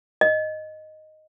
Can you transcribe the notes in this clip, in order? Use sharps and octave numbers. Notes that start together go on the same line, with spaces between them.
D#5